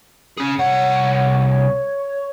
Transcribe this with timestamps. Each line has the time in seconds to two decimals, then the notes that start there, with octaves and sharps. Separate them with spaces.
0.37 C#4 G#4
0.59 C2 C#5 F#5